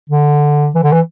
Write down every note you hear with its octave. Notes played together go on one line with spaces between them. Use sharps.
D3
E3
D3
E3